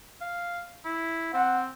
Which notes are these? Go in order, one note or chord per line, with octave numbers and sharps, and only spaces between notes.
F5
E4
C4 F#5